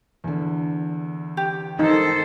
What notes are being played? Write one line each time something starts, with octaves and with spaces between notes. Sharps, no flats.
E2 D3
G4
D#3 D#4 A4 C5